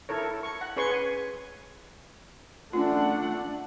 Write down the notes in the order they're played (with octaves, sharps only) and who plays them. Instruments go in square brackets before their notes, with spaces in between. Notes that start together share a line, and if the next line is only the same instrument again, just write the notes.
[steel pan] E4 A4 A#4 C#5
A4
C#6
F#5
C#4 G#4 B4 C#5 C6 C#6
G#5
[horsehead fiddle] A3 F#5 [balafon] C#4 F4 [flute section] D4